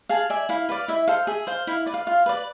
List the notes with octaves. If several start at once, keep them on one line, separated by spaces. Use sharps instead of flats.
G#4 F5 A5
D5 E5 G#5
E4 F5
B4 D5 F5
E4 E5
A4 C5 F5
G#4 E5
C5 F5
E4 F5
B4 D5
F5
F4 F5
B4 D5